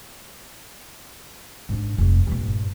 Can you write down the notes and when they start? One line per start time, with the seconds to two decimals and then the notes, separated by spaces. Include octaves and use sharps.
1.69 G#2 D4
1.98 F1 G2
2.27 G2 A#2